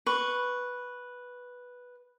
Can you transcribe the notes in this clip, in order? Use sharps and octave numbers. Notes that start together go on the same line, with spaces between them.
B4 C#6